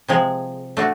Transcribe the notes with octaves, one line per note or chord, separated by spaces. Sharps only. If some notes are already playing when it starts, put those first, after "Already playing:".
C3 F3 G#3
A3 D4 F#4